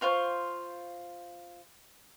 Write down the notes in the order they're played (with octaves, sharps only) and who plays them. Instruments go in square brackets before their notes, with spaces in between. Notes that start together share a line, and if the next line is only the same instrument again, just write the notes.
[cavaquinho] F4 C5 F5 C#6